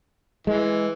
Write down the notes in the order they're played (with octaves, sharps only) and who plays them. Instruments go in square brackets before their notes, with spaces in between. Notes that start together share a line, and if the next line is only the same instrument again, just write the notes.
[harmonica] E3 [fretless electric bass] G#3